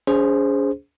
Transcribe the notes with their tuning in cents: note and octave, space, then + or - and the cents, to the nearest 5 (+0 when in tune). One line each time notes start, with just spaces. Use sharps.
C#4 +45 G#4 +0 C5 +0